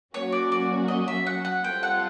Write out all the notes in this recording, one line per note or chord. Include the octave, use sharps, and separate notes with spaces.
F#3 A#3 C#4 F#4 C#5
D5
D5
D#5
E5
F#5
F#5
G3 C4 F4 A4 G5
F#5